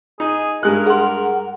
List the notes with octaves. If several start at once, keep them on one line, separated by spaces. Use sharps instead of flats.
D#4 G#4
G2 G#3 G4 A#4 F#6
G#4 F#5 C6